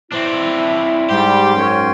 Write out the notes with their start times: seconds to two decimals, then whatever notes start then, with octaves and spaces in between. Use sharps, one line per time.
0.12 C4 D4 E4
1.09 G#2 G3 G4 G5 C6
1.54 F#2 C#4